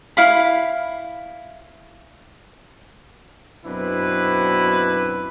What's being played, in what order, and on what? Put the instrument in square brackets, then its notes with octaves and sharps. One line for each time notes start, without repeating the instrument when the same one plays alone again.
[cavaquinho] E4 F5 B5
[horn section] F#2 B2 C4 D4 E4 B4